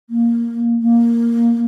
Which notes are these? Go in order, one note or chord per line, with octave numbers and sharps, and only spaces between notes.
A#3
A#3